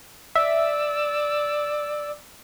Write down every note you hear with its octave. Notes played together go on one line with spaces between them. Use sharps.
D5 E5 E6